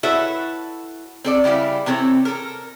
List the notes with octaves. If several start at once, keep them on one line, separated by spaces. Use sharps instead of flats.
E4 F#4 A4 B4 C#5 E5
C4 A4 D5
C#3 G3 E4 F5
C3 E3 C4 A4 C#5
A4 A#4